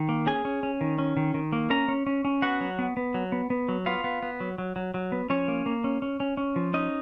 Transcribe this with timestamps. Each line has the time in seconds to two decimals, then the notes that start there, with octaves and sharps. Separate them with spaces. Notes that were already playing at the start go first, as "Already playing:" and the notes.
Already playing: D#3
0.09 A#3
0.26 C#4 G#4 G#5
0.45 C#4
0.63 C#4
0.81 D#3
0.98 C#4
1.17 D#3
1.34 D#3
1.53 A#3
1.70 C#4 A#4 A#5
1.88 C#4
2.07 C#4
2.25 C#4
2.42 B3 F#4 F#5
2.61 F#3
2.79 B3
2.97 B3
3.14 F#3
3.32 B3
3.50 B3
3.69 F#3
3.86 B3 F4 F5
4.04 B3
4.22 B3
4.40 F#3
4.58 F#3
4.76 F#3
4.94 F#3
5.12 B3
5.30 F3 C#4 C#5
5.48 A#3
5.66 A#3
5.84 C#4
6.02 C#4
6.20 C#4
6.37 C#4
6.56 F3
6.74 C#4 D#4 D#5